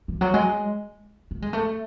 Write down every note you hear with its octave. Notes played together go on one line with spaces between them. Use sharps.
E3
F#3
G#3
A3
G#3
A3